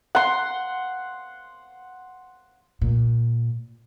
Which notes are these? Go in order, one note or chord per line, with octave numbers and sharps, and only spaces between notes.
F#5 C6
A#2